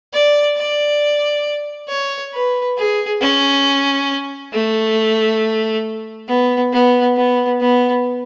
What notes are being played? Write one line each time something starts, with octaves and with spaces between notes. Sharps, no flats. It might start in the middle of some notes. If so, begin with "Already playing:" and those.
D5
D5
C#5
B4
G#4
C#4
A3
B3
B3
B3
B3